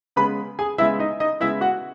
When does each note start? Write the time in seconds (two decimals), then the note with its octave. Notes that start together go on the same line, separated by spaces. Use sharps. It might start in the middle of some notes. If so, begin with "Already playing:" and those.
0.16 C#3 G#3 B3 B4 B5
0.59 G#4 G#5
0.78 C#3 G#3 B3 E4 E5
0.99 D#4 D#5
1.20 D#4 D#5
1.40 C#3 G#3 B3 E4 E5
1.61 F#4 F#5